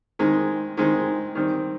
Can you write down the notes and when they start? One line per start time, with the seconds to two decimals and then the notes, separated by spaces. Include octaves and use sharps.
0.19 D#3 G#3 C4
0.77 D#3 G#3 C4
1.35 D#3 G3 C4